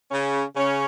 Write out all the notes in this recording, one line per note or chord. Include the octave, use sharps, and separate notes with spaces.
C#3 C#4
C#3 C#4